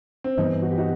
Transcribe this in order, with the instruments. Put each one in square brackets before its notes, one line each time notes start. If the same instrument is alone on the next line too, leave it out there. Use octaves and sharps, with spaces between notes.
[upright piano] C4
[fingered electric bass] G2 E3 G3 B3 [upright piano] D#4
[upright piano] F#4
G4
D#4 F#4